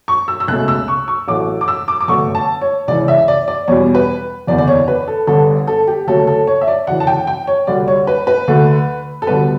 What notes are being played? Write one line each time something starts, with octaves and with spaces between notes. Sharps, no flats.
C#6
E6
E6
C#2 B2 A3 F#6
E6
C#6
C#6
A1 A2 F#3 A3 D6
D6
E6
D6
D6
G1 F#2 D3 A3 C#6
A5
C#5
C#2 C#3 E3 D5
E5
D5
D5
E2 B2 G3 C#5
B4
F#1 E2 D3 D5
D5
C#5
B4
A4
G1 G2 D3 A4
A4
G4
D2 C#3 F#3 A3 A4
A4
C#5
E5
D5
D2 C#3 E3 F#5
A5
G5
G5
C#5
D2 D3 G3 D5
C#5
B4
B4
D2 D3 A3
A4
D2 D3 G3 B3 B4